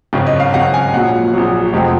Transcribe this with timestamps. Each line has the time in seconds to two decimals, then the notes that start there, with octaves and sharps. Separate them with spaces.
0.13 G#1 F#2 C#3
0.27 D#5
0.40 F5
0.53 G#1 F#2 C#3 F#5
0.74 G#5
0.93 A#1 A#2 F#3 F#5
1.34 A#1 A#2 F#3
1.73 F1 F2 C3 F3 G#3